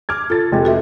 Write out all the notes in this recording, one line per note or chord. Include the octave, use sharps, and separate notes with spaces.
D6 F6 G#6
F4 A4 A6
F1 G#3 G4
F#4 A4 E5